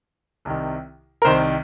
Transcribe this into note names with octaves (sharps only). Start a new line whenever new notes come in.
C2 C3 D#3
A#4
C2 C3 D#3 C5